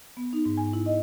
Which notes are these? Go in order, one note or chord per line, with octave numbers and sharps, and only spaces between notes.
B3
D#4
G#2
G#5
E4
D#5